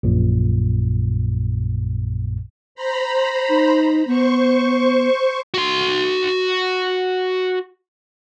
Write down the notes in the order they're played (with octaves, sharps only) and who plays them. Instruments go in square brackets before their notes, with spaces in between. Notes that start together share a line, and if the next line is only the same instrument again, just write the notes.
[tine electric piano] A#1 F#2 A#2
[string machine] C5 A#5 B5
[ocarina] D#4
[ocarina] B3 [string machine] C5 C#6
[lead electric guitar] F#4 C6